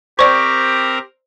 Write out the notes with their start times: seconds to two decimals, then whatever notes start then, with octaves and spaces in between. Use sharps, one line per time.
0.19 C4 G4 A#4 C5 D5 A#5 C#6